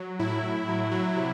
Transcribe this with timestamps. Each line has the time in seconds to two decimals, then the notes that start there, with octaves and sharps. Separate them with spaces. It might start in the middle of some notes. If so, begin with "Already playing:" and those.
Already playing: F#3
0.19 A2 E4
0.43 A2
0.68 F#3
0.91 F#3
1.16 C3